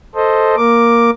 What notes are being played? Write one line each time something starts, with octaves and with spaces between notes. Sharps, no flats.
A4 C5 D#5
A#3 A#4 D6